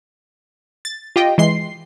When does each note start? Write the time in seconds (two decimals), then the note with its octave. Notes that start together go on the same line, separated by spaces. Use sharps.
0.85 A6
1.16 F4 G4 D#5 G5
1.38 E3 G#3 C6 C7